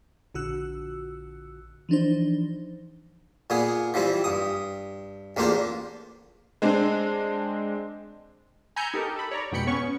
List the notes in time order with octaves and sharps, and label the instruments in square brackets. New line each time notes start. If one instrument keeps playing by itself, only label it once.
[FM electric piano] A#1 D3 F#4 E6 F#6
E3 F3 D4 D#4 C5
[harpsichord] A#2 B3 G#4
E3 F3 G3 C4
G2 D#6
A1 E2 A#3 D4 F4 C5
[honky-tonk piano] G#3 C4 D4
[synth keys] G#5 A#5 B5 E6 G6 C#7
D#4 G4 A4 A#4
A4 B5
C#5 D5 A#5
F2 G#2 B2 G5 B5 C#7
B3 C#4 C#6